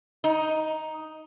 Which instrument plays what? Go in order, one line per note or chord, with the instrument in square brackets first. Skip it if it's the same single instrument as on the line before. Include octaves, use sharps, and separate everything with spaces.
[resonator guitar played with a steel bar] D#4